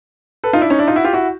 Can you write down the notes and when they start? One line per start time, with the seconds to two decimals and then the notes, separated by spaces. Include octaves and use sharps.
0.44 A4 B4
0.53 D#4 F4
0.61 D4 E4
0.70 C#4 D#4
0.79 D4 E4
0.87 D#4 F4
0.96 E4 F#4
1.04 F4 G4
1.13 E4 F#4